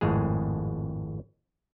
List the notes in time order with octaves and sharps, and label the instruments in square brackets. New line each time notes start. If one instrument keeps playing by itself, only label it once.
[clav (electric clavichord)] G#1 F2 A2 G#3 G#4